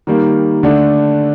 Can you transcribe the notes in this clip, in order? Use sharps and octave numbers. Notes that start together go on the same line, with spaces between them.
D#3 G3 A#3
D3 A3 D4